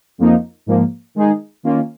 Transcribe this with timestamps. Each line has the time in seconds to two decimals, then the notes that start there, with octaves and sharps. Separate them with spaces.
0.18 F2 F3 A#3 D#4
0.66 G#2 F3 A#3
1.15 D#3 G#3 D#4 G#4
1.63 D#3 A#3 C#4 F4